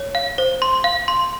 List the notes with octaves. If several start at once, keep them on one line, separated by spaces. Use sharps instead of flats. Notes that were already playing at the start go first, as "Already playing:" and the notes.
Already playing: C#5
F5
C5
C6
F5
C6